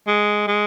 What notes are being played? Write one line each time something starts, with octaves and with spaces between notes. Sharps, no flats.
G#3
G#3